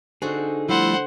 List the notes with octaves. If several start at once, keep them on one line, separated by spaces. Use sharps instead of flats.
D3 C4 D#4 F#4 G#4
F3 G3 A3 E4 C5 F#5